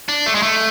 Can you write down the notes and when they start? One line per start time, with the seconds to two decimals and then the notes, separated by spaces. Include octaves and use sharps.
0.09 D4
0.26 A3
0.35 G#3
0.42 A3